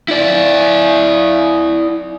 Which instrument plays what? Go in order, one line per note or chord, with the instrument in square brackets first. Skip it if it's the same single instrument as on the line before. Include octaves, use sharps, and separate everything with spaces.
[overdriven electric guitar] E4 D5